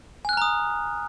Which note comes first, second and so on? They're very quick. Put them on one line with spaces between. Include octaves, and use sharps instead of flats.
G#5 F#6 F6 A#5 D#6